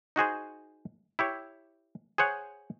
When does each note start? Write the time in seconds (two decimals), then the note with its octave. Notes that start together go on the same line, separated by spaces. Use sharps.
0.16 D#4 F#4 G#4 C5
1.19 E4 G4 C#5
2.18 G#4 C5 C#5 F#5